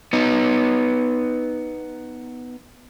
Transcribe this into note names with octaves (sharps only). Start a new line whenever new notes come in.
B3 D#4